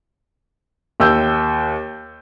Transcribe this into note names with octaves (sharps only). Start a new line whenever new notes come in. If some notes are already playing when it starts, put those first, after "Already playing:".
D#2 G5 E6 G6